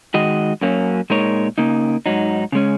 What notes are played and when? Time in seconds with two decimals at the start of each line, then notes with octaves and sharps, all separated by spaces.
0.14 D#3 G#3 F#4 D#5
0.61 F#2 F#3 A#3 C#4
1.10 A#2 G#3 D#4 A#4 C#5
1.58 C#3 A#3 D#4
2.06 G#2 F#3 D#4
2.52 C#3 G#3 C#4